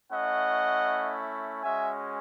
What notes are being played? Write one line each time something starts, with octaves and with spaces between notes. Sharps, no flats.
A3 C#4 E4 D#5 F#5
G#3 C#4 F#4 E5 G#5